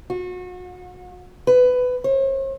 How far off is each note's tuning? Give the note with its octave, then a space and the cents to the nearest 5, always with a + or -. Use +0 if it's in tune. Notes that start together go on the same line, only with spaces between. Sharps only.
F#4 -35
B4 +15
C#5 -45